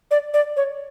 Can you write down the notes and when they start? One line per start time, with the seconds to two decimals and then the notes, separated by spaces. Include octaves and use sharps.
0.11 D5
0.34 D5
0.57 C#5